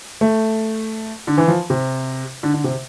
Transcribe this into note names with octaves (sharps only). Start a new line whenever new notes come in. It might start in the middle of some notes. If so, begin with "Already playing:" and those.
A3
D3
E3
F3
C3
D3
D3
C3